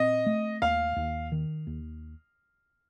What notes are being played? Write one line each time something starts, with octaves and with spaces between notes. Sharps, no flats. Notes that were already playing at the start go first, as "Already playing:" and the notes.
Already playing: A#2 C4 D#5
A3
D#2 F5
D#2
D#3
D#2